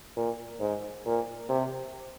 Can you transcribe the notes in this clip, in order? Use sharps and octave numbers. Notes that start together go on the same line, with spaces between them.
A#2
G#2
A#2
C3